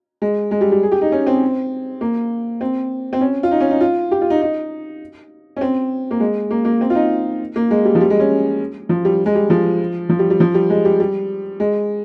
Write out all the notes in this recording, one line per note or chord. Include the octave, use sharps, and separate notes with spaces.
G#3
G#3
G3
G3
G#4
G4
D#4
C#4
C4
A#3
C4
C4
C#4
F4
D#4
C#4
D#4
F4
G4
F4
D#4
D#4
C#4
C4
A#3
G#3
A#3
A#3
C4
F4
D#4
A#3
G#3
G3
F3
G3
G#3
C#4
F3
G3
G#3
G3
F3
F3
G3
G3
F3
G3
G#3
G3
G3
G#3